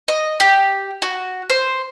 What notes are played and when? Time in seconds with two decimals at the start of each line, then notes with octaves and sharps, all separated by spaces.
0.08 D#5
0.40 G4
1.02 F#4
1.50 C5